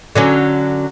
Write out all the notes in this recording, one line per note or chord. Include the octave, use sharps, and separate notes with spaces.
D3 F#3 C#4